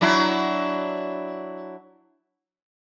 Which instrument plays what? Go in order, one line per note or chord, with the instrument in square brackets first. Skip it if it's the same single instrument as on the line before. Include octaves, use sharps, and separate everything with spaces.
[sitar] F#3 D4 E4